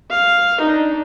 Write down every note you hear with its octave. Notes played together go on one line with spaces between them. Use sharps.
F5
D4 D#4